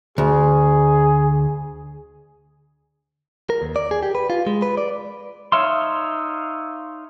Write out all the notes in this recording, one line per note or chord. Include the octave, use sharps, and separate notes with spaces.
D2 G#4
A#4
D#2
D5
G#4
G4
B4
F4
G#3
B4
D5
D#4 C#5 E5 F5 C6